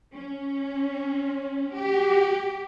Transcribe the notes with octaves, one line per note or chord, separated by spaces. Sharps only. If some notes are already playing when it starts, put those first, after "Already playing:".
C#4
G4